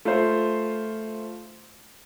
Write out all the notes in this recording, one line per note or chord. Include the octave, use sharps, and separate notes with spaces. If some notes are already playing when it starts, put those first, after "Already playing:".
A3 F4 C5